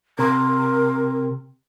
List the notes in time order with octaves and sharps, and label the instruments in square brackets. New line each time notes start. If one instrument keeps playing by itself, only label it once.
[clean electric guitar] C3 [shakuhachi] A#4